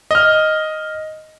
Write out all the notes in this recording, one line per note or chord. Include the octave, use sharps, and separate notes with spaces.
D#5 F6